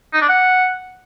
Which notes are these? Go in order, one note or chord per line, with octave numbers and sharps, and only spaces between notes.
D#4
D4
F#5